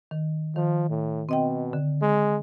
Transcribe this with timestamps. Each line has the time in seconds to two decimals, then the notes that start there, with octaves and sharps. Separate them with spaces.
0.11 D#3
0.56 D#3 F3
0.90 A2
1.29 B2 C4 D#5 G5
1.73 D3
2.02 G#3